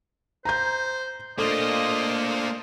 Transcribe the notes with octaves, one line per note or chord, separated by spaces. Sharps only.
C5 A#5 G6
A3 A#3 D4 F4 A4 C5 D#5